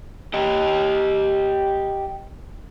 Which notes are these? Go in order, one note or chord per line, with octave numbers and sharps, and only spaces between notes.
G4 D#5